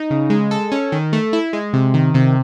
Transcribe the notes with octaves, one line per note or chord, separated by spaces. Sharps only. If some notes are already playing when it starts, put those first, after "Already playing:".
Already playing: D#4
C#3
G#3
A4
C#4
D#3
A3
E4
G#3
C3
D#3
C3